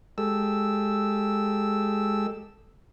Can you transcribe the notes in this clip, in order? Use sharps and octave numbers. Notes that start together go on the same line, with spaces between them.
G#3 G4 A4 E6